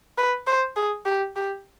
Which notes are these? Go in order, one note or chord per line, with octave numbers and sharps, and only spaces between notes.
B4
C5
G#4
G4
G4